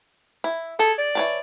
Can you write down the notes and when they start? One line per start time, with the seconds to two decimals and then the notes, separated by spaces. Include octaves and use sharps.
0.44 E4
0.79 G#4 A4
0.98 D5
1.15 E3 C#5 A5